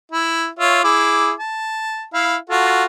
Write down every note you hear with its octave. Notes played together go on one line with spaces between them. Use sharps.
E4
F4 C#5 E5
E4 G#4 D6
A5
E4 F5
F4 F#4 A4